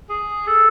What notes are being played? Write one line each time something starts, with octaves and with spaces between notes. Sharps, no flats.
G#4
A4